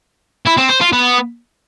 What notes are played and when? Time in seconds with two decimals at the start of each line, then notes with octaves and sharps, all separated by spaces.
0.47 E4
0.58 C4
0.70 C5
0.81 F4
0.93 B3